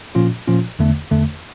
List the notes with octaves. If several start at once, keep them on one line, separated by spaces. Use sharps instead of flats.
A#2 F3 C#4 F4
A#2 F3 C#4 F4
E2 D3 A3
E2 D3 A3